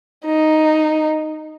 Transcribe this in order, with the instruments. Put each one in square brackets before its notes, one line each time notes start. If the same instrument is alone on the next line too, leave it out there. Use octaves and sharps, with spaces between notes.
[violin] D#4